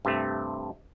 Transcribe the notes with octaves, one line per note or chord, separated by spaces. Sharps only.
G2 C3 A3